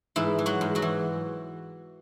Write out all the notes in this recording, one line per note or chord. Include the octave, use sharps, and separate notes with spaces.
G#2 E3 E4
E3
F#3 F#4
G#2
F#3 F#4
E3